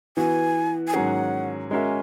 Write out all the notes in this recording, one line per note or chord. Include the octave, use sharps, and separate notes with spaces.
E3 B3 F#4 G#5
G#5
G#2 D#3 F#3 C#4 G#4 F#5
G#3 C#4 F#4 A#4 E5 G#5